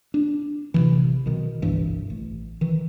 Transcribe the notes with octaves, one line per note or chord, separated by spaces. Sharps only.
D4
A1 C3 D#3 E3
B1 B2 D#3
G1 C2 G2 E3
A1
D#3 E3